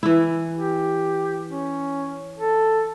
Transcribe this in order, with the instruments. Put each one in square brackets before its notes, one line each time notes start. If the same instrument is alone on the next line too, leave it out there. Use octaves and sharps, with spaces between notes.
[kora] E3 E4
[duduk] G4
C#4
A4